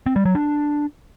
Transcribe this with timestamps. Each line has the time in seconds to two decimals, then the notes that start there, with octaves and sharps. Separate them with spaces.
0.06 C4
0.16 G3
0.25 F#3
0.35 D4